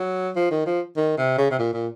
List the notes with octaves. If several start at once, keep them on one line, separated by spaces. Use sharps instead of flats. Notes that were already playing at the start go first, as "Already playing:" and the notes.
Already playing: F#3
F3
D#3
F3
D#3
C3
C#3
C3
A#2
A#2